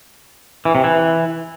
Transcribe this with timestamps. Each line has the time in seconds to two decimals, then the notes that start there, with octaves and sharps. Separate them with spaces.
0.65 E3
0.75 C3
0.84 E3